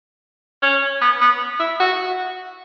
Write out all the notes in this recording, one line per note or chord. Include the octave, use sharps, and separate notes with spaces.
C#4
B3
B3
E4
F#4